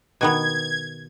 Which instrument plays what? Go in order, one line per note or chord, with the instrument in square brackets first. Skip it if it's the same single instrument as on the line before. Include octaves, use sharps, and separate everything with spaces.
[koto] B2 D#3 B3 [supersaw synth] G#6